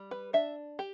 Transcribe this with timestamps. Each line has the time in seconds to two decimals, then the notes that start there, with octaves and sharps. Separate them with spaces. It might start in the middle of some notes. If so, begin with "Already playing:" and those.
Already playing: G3
0.11 B4
0.33 D4 E5
0.79 G4